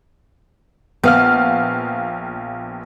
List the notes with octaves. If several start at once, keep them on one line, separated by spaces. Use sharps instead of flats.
A#1 B3 F5 F6